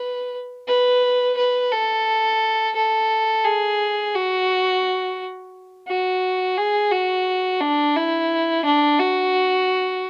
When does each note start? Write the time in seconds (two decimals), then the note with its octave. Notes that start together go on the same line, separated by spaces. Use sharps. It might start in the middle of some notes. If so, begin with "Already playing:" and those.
Already playing: B4
0.68 B4
1.37 B4
1.72 A4
2.76 A4
3.45 G#4
4.15 F#4
5.88 F#4
6.58 G#4
6.92 F#4
7.61 D4
7.96 E4
8.65 D4
9.00 F#4